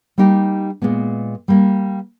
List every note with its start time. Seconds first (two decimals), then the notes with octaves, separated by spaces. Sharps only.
0.18 G3 A#3 D#4 G4
0.82 A#2 G#3 B3
1.48 G3 A#3